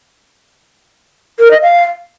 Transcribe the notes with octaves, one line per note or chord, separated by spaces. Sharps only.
A#4
D#5
F5